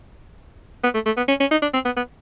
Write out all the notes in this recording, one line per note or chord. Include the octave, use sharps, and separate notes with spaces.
B3
A3
A3
B3
C#4
C#4
D#4
D4
C4
B3
B3